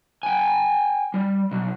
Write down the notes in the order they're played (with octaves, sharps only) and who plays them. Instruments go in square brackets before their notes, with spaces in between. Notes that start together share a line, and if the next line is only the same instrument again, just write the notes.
[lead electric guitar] G5 G#5
G3
B1